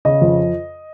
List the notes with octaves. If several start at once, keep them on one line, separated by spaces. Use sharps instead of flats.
C#3 D#5
F2